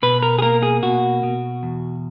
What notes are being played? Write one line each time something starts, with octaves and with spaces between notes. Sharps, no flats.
B2 B4
A#4
G#4
A#3 A#4
G#4
B2 F#4
B2
E2